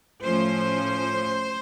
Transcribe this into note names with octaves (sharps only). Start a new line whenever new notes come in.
A2 F3 A3 C#4 C5